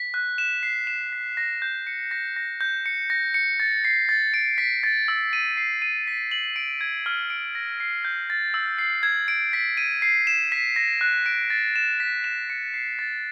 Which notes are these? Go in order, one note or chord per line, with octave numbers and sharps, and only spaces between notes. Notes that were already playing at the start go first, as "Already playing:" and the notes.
Already playing: B6
F#6
E7
C7
E7
B6
A#6
G6
C#7
A#6
A#6
G6
C#7
A#6
C#7
A6
C7
A6
D7
B6
A6
E6
D#7
C7
D#7
B6
F#7
D7
G#6
F6
D7
A#6
C7
G6
A6
E6
C7
G#6
D7
B6
D#7
C7
E7
B6
A#6
F#6
D7
A6
E7
B6
E7
C#7
C7
A6